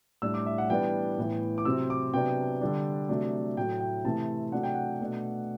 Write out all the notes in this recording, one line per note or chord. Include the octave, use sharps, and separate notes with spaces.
A2 G3 D4 E6
D6
E5
F#5
E3 G3 B3 D4 G5
A2 E3 B3
D6
C3 F#3 C4 E6
D6
C3 F#3 B3 D4 G5
D3 G3 D4
C3 F#3 A3 D4
A2 F#3 A3 G5
G5
C3 E3 A3 C4 A5
C3 F#3 A3 D4 F#5
G5
F#5
B2 A3 D4